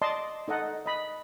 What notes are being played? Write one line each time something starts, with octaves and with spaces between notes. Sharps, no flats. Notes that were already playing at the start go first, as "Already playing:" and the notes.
D5 D#5 A5 C6
D#4 A4 D#5 F#5
D#5 B5